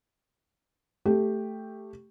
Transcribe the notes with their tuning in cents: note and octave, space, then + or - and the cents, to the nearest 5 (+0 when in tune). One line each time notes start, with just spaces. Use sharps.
A3 +0 G4 +0